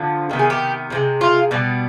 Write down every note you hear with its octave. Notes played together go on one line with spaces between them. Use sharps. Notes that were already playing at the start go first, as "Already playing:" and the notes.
Already playing: D3 F3 B3
C3 D#3 B3
G#4
G4
C3 F3 G#3
F4
B2 G3 B3